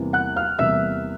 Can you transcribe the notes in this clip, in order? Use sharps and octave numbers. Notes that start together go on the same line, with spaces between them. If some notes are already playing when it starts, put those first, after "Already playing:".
Already playing: E2 C3 E3 G3 A#3
F#5 F#6
F5 F6
E2 C3 E3 G3 A#3 E5 E6